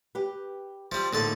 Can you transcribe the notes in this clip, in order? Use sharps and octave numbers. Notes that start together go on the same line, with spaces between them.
G4 B4
F3 G3 E5
A#1 A2 D3 A3 D#4 A5